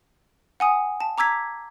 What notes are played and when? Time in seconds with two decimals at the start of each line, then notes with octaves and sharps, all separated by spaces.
0.60 F#5 G#5 D#6
1.00 A5
1.18 A#5 D6 E6 G#6 B6